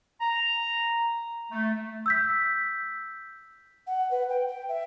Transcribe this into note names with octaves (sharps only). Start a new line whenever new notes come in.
A#5
A3
E6 G6 B6
F#5
B4
G5
G5
E5